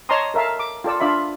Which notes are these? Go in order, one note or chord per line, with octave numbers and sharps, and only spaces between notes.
C#5 D#5 A5 A#5 C6 D#6
A4 A#4 E5 F5 A5
D6
F4 A4 D5 E6
D4 F4 D5 E5 B5